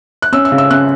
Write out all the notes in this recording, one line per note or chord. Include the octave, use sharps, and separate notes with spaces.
F#6
C#4 E6
E6
C#3
E6
C#4 F#6